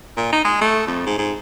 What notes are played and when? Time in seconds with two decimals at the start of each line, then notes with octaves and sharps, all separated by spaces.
0.17 A#2
0.32 D#4
0.45 G#3
0.61 A3
0.87 F2
1.06 G#2
1.18 G#2